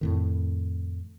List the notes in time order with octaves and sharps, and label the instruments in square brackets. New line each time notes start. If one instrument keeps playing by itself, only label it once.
[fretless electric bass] F2 A2 D#3